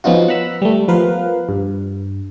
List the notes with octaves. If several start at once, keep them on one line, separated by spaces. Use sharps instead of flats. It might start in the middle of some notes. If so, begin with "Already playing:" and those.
F3 B3 C#4 D#4 F4 F#4
F#5 A#5 B5 E6
G3 A3
F3 B3 A#4 B4 F5
G2